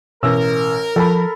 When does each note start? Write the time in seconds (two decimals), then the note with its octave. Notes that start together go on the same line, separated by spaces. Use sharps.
0.23 A1 B2 A#4 E6
0.96 F3 A4 B5